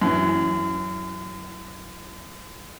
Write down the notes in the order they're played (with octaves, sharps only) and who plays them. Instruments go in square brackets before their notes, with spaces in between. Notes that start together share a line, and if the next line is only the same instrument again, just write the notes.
[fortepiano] F#2 E3